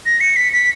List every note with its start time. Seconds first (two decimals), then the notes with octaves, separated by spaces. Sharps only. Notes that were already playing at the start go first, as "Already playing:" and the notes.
0.06 A#6
0.20 C#7
0.36 B6
0.53 B6